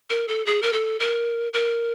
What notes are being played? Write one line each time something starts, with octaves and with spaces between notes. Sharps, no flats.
A#4
A4
G#4
A#4
A4
A#4
A#4